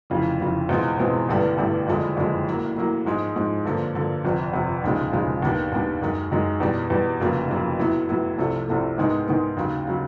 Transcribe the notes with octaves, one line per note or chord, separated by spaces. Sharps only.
F1 F2 C#3 E3
F1 F2 C#3 E3
E2 B2 G#3 C4 F4
E2 B2 G#3 C4 F4
A1 G2 D3 G3 B3
A1 G2 D3 G3 B3
F#1 F2 D3 F3 G#3
F#1 F2 D3 F3 G#3
A2 F#3 A#3
A2 F#3 A#3
G#2 F3 G#3
G#2 F3 G#3
G2 D3 F3 A#3
G2 D3 F3 A#3
G1 F2 C3
G1 F2 C3
E1 D#2 C#3 F3 G#3
E1 D#2 C#3 F3 G#3
D#2 D#3 G3 B3 D4
D#2 D#3 G3 B3 D4
F#2 D#3 G#3
F#2 D#3 G#3
E2 B2 G3
E2 B2 G3
F1 F2 C#3 F#3 A#3
F1 F2 C#3 F#3 A#3
A2 F#3 B3 E4
A2 F#3 B3 E4
C2 C3 F3 A3
C2 C3 F3 A3
G#2 D#3 G#3 B3
G#2 D#3 G#3 B3
D#2 C#3 F#3
C#3 F#3